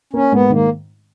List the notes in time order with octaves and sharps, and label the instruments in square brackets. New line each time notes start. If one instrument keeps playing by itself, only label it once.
[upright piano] A#3 [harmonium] C#4
[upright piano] G#2 [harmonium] B3
[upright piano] D#3 [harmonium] A#3